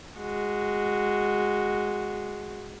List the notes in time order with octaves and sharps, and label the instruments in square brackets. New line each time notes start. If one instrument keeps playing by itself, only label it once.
[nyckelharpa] G#3 F#4